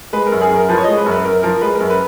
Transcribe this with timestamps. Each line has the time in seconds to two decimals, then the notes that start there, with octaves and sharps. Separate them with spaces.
0.13 G#3 B4
0.27 A#4
0.32 F#2
0.41 G#4
0.50 F#2
0.56 A#4
0.69 F3 B4
0.78 C#5
0.83 G#3 D#5
0.97 B4
1.06 F#2
1.11 B4
1.25 F#2 A#4
1.43 F3 A#4
1.61 G#3 B4
1.75 A#4
1.80 F#2
1.90 B4